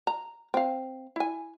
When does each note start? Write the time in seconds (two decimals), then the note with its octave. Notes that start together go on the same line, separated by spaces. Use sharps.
0.07 A#5
0.54 C4 F5
1.16 E4 G#5